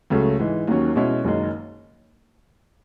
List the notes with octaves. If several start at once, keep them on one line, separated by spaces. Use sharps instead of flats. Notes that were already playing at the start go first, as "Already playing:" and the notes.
C#2 C#3 F#3 A3
G#2 E3 G#3
D#2 D#3 F#3 C#4
B2 G#3 C#4 E4
F#1 F#2 D#3 G#3